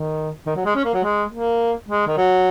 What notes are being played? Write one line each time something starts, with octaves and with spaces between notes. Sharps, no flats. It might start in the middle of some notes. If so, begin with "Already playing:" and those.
Already playing: D#3
D#3
F#3
G#3
C#4
A#3
F#3
G#3
A#3
G#3
D#3
F#3